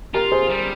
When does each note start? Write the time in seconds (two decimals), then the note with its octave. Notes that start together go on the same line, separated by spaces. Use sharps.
0.14 F4 G4 A#4
0.32 G#4 C5
0.50 G3